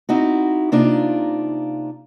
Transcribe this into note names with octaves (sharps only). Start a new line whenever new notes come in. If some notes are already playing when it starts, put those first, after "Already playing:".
C4 D#4 E4 F#4
C3 A#3 D4 D#4 F4